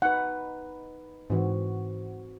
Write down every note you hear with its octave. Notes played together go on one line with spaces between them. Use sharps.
D#4 B4 F#5
G#2 E3 C4 F#4